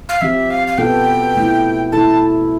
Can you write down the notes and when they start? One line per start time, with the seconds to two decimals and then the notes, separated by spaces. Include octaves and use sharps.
0.09 F5
0.21 F3 C4 G4 E5
0.50 F5
0.68 F5
0.78 B2 B3 F4 A4 G5
1.36 B2 A3 E4
1.92 B2 A3 E4 A4 A5